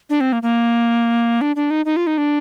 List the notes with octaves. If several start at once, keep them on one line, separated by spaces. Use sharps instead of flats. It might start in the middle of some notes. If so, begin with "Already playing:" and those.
D4
C4
A#3
A#3
D4
D4
D#4
D#4
F4
D#4
D4